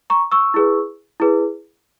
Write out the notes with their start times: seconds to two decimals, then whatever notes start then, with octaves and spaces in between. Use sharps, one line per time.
0.10 A#5 C#6
0.32 C#6 E6
0.54 E4 G#4 B4
1.20 E4 G#4 B4